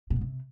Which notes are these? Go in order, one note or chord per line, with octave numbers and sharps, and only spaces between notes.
B2
G#2
C3